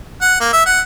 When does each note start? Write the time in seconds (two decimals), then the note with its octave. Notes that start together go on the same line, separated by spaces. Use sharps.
0.22 F#5
0.41 A#3
0.53 E5
0.66 F#5